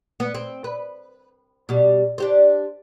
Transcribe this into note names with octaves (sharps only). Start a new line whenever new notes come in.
B3
C4
B4
B2 G3
D4 G4 C5